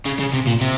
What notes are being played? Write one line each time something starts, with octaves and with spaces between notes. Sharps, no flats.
C#3
C#3
C3
A#2
C3